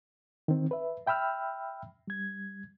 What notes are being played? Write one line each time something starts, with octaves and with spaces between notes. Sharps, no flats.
D#3 C4
B4 E5
E5 G5 B5 E6 F6
G3 G#6